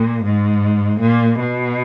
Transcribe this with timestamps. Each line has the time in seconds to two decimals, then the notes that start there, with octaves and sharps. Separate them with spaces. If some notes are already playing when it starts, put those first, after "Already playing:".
Already playing: A#2
0.23 G#2
1.00 A#2
1.39 B2